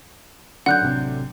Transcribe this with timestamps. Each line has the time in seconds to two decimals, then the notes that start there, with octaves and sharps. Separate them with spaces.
0.66 D3 F#3 D4 F#5 F#6 G6
0.82 A1 C3